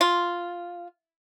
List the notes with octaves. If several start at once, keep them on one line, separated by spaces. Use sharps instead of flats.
F4